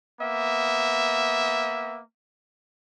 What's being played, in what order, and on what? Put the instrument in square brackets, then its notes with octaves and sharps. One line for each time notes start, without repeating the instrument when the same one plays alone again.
[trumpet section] A#3 B3 E5